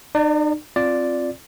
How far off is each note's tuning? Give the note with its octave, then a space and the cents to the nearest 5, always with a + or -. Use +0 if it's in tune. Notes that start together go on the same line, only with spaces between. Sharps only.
D#4 -45 D5 +0
C4 +15 F4 +0 D5 +0